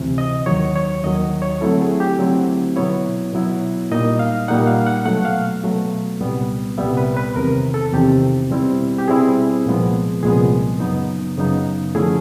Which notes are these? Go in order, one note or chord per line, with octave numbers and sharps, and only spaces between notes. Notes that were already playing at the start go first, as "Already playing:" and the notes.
Already playing: D2 C3 E3
D#5
D#2 D#3 F#3 C#5
C#5
D#2 D#3 F#3 D#5
C#5
D3 F#3 A3 C4 E4 A4
G#4
G4
D3 F#3 A3 C4 E4
B2 F#3 B3 E4 C#5
B2 F#3 B3 E4
A#2 G3 A#3 D#4 D#5
F5
A#2 G3 A#3 D#4 F#5
F5
F#5
B2 F#3 A3 F#5
F5
B2 F#3 A3
C2 A#2 G3 B3
C2 A#2 G3 B3 E5
B4
B4
E2 C3 D#3 A#4
A4
E2 C3 D#3 G4
B2 G3 C4 E4
G4
B2 G3 C4 E4 G#4
C2 A#2 F3 G#3 B3
C2 A#2 F3 G#3 B3 G#4
F#2 C#3 F#3 B3 D#4
F#2 C#3 F#3 B3 D#4
D3 F3 A3 C#4 E4 G#4